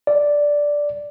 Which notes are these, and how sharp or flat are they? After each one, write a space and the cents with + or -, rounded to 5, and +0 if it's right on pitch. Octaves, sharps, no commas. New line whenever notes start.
D5 -5